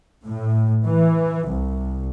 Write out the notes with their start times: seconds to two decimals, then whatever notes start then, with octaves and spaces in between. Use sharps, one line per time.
0.24 A2
0.85 E3
1.46 C2